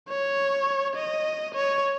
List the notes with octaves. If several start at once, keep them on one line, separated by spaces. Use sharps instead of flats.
C#5
D#5
C#5